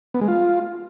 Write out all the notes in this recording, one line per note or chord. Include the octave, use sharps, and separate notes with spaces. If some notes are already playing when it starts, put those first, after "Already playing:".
B3
G#3
F4